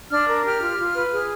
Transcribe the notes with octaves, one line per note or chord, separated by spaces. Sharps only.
D4 F6
A#4
G4 F6
F4
F4
B4
G#4